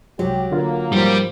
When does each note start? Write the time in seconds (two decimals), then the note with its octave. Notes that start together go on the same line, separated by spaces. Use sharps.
0.19 C2 F#3 G#3 G4
0.52 D3 A#3 F4
0.92 G#2 F3 G3 C5